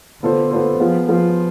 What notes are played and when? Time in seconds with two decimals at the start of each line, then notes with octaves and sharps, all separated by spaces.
0.22 D3 B3 F4 A4 C5
0.51 B3 F4 A4 C5
0.80 F3 B3 F4 G#4
1.08 F3 B3 F4 G#4